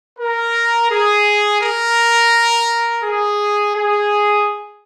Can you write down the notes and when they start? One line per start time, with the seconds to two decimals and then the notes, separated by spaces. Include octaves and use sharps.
0.19 A#4
0.91 G#4
1.62 A#4
3.03 G#4
3.75 G#4